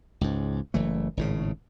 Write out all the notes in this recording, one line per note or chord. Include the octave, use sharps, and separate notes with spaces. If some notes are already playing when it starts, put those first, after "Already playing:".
C#2 G#2
F#1 E3 A3
G#1 A2 C#3